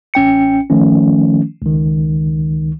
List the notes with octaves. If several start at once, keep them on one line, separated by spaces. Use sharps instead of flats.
A1 C#4 G5 C#7
D#3 F3 A3 C#4
C#2 D#3